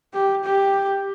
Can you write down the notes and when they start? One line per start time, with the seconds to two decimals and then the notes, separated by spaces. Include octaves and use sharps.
0.14 G4
0.44 G4